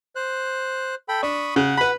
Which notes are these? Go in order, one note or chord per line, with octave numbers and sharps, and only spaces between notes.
C5 F#6
A4 G5 B5
D4 B5 C#6 D#6
C#3 F#5
B4 B5